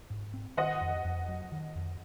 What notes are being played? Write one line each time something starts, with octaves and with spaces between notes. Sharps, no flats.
G#2
C4
D#3 D#5 F#5
F2
F2
F#3
D#3
F2